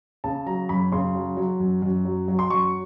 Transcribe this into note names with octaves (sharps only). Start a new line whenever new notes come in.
C#3 A5
F#3 A#5
F#2 B5
C#3 C6
F#3
F#3
F#2
F#2
F#3
F#3
C6
F#2 C#6